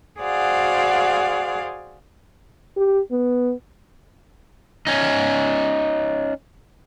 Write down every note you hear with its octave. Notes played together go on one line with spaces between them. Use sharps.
F#4 G#4 C5 D5 F5 F#5
G4
B3
C#4 D#4